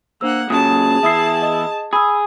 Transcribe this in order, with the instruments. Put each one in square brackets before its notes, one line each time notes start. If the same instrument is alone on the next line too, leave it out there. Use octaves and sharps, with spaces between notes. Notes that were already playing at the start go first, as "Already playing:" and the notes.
[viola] A#3 F#5 [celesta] D4 C5 E6
[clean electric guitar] A#2 C#3 F#3 [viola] G#4 A5 [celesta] D#6
[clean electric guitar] E2 E4 [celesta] E5 D#6 C7
[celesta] D#5 D#6
[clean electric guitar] G#4 [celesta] B5 E6